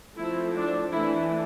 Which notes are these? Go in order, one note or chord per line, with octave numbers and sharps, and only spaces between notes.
F3 A3 C4 E4
D4
E3 A3 D4 E4